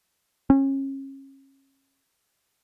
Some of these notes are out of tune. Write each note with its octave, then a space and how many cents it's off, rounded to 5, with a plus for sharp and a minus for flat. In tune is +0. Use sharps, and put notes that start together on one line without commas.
C#4 -30